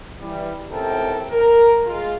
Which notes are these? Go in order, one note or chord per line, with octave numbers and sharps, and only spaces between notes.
E3 G3
C#2 A2 C3 A4 A#4 G5
A#4
G#3 F4